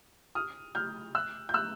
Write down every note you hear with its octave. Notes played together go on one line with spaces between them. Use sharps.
D#6 F6
F6 G6
E6 F#6
G6
E6 F#6